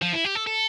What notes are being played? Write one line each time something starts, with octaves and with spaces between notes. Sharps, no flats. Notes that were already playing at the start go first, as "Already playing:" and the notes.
F3
E4
G4
A4
A4